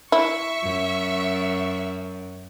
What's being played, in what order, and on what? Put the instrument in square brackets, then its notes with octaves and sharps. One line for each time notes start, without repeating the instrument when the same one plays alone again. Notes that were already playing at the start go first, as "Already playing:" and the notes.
[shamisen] E4 [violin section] E5 C#6
[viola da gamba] F#2